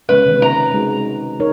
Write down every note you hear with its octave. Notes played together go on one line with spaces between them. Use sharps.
C#3 G#3 C#4 B4
C3 D#3 C4
A#5
G#3 D#4 F#4
D#4 A#4 C#5